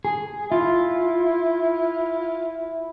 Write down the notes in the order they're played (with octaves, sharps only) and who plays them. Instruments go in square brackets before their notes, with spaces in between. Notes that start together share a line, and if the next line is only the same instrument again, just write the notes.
[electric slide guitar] G#4
[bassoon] E4 [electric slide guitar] F4